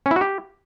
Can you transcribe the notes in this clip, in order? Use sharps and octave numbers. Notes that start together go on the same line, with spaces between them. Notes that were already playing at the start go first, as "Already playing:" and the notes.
C#4
E4
F#4
G4